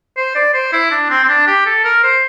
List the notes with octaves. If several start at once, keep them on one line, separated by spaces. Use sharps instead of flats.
C5
D5
C5
E4
D4
C4
C4
D4
G4
A4
A#4
C5